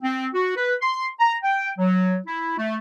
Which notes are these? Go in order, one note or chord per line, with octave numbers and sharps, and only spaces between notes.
C4
F#4
B4
C6
A#5
G5
F#3
E4
A3